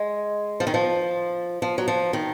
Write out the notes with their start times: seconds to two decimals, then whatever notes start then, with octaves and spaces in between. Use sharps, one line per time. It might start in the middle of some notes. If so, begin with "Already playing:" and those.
Already playing: G#3
0.60 F3
0.67 D#3
0.74 F3
1.62 F3
1.78 F#3
1.88 F3
2.13 D#3